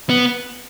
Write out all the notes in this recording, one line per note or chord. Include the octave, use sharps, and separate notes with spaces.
B3